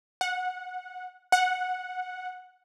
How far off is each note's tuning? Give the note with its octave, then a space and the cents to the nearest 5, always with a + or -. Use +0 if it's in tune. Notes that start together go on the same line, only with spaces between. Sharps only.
F#5 -15
F#5 -10